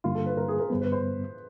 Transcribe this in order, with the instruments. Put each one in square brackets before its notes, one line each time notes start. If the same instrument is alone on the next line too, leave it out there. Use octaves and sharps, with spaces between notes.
[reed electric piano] G2 D3 G3 A#3 [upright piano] F4
[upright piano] A4
B4
A#4
G#4
A#4
[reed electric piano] G2 D3 G3 B3 [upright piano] C5
[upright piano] B4
C5